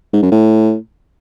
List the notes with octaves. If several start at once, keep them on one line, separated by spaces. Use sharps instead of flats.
G#2
F#2
A2